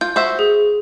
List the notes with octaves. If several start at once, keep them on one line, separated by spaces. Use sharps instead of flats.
F4 G6
F#4 C5 E5
G#4